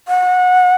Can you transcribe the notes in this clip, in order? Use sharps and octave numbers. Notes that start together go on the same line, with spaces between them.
F#5